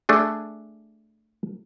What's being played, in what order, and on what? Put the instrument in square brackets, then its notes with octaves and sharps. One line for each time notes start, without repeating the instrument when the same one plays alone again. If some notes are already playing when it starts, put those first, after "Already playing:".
[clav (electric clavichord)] A3 D4 G#4